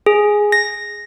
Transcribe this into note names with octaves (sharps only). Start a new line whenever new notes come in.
G#4
A#6